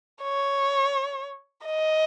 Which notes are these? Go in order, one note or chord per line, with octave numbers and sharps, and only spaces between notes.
C#5
D#5